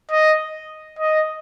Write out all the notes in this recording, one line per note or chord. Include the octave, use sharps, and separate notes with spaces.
D#5
D#5